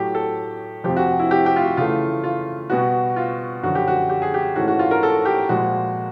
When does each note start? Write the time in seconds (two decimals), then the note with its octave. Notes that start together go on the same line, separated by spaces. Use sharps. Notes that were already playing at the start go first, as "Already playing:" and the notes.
Already playing: A2 F#3 A3 G4
0.15 A4
0.84 F2 C3 F3 G4
0.97 F#4
1.19 E4
1.31 G4
1.46 G4
1.56 F4
1.62 F#4
1.77 C#3 E3 A3 F4
2.24 F4
2.70 B2 G3 B3 F#4
3.16 F4
3.63 F#2 D3 F3 F#4
3.75 G4
3.88 F#4
4.10 G4
4.22 G#4
4.34 G4
4.56 G#2 E3 A3 C#4 F#4
4.68 F#4
4.79 F4
4.91 A#4
5.03 A4
5.25 G4
5.49 A#2 F3 G#3 F#4